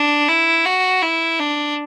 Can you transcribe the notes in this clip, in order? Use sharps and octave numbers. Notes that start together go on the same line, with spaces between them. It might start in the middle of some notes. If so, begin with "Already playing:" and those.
Already playing: D4
E4
F#4
E4
D4